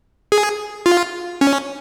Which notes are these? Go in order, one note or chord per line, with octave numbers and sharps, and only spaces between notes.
G#4
F4
C#4